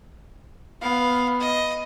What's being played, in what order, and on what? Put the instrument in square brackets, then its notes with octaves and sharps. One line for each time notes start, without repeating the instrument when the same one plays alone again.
[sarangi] B3 [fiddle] F5
[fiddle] D#5